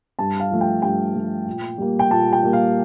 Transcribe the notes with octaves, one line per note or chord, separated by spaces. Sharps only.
G2 A5
F5
F3 A3
G5
G2 G5
F3 A3
A#2
G3 A#3
G5
A#2 A5
G5
G3 A#3
F5